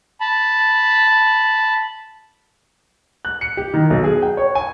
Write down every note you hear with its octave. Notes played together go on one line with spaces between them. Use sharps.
A5 B5
F#6
C#7
G4
D#3
B1
G#4
G5
C#5
G#5